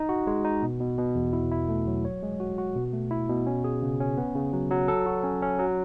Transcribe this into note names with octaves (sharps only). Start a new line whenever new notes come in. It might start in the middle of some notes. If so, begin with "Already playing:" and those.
Already playing: D#4
F#4
G#3
D#4
B2
B2
B2
E2
E4
E4
A3
F#3
C#5
G#3
F#4
F#4
B2
A3
E4
B2
C#4
G#4
C#3
C#4
B3
C#3
F#3
F#3
A4
F#4
C#4
C#4
F#3